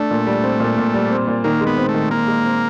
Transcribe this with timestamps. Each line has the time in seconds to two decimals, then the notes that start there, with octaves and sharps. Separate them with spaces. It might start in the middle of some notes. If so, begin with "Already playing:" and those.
Already playing: A3 D4
0.11 A#2
0.27 G3
0.44 C4
0.60 A#2
0.78 A#2
0.94 G3
1.10 C4
1.27 A#2
1.44 D#3 A#3
1.61 G#3
1.67 B3
1.78 C4
1.89 A3
1.94 D#3
2.11 D#3 A#3
2.28 G#3
2.45 C4